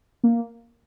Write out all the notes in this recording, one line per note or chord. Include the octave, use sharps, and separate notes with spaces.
A#3